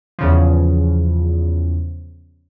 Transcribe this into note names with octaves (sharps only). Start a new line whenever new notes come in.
E2 C#3 F3